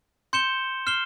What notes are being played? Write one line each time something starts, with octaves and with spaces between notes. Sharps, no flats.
C6 G6 C#7 E7 G7
F6 C7 E7 G7